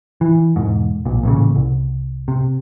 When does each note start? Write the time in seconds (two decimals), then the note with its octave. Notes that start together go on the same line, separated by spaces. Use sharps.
0.21 E3
0.56 E1 G#2
1.05 B1 A#2
1.23 A1 A#2 C#3
1.56 C2
2.28 C3